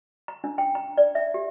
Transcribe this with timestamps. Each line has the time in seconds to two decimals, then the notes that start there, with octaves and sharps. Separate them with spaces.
0.28 A#5
0.44 D4
0.58 G5
0.75 A#5
0.97 D5
1.15 E5
1.34 G4